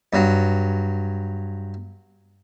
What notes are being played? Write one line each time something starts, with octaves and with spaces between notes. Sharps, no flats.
G2 F#3